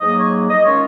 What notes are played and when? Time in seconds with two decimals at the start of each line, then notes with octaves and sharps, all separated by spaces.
0.01 G#2 F#3 A#3 D#5
0.18 C#5
0.49 D#5
0.65 D#3 G#3 C#4 F4 C#5